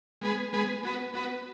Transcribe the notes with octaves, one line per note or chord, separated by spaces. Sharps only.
G#3 B3 G#4 B4
G#3 B3 G#4 B4
B3 F#4 B4
B3 F#4 B4